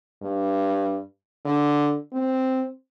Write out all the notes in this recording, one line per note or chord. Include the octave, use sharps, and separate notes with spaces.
G2
D3
C4